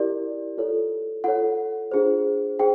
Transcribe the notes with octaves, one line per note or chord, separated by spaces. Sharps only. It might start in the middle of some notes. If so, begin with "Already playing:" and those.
Already playing: E4 G4 A#4 D5
F4 A4 C#5
F4 A4 C#5 F#5
D4 F4 G#4 C5
G#4 C5 G5